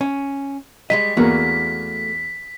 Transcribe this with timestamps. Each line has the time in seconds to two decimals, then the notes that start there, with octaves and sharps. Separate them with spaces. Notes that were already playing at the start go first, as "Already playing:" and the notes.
0.01 C#4
0.90 G3 G#3 D#5 B6
1.17 E2 A3 A#3 F#4